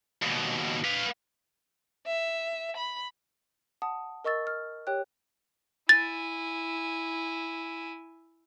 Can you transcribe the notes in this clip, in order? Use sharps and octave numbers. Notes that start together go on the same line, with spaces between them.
D#2 B2
B4 F5
E5
B5
F#5 A5 D#6
A#4 D#5 C#6 E6 A6
F6
G4 C#5 G5 F#6
E4 G#5 A6